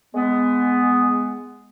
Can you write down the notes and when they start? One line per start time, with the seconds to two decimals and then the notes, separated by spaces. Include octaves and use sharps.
0.15 G#3 B3